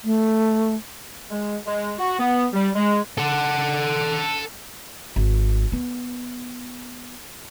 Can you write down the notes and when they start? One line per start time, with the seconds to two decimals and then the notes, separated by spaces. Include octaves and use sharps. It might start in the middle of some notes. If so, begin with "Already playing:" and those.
0.04 A3
1.30 G#3
1.66 G#3
1.98 F#4
2.19 B3
2.53 G3
2.75 G#3
3.18 A4 F#5
5.16 G#1
5.72 B3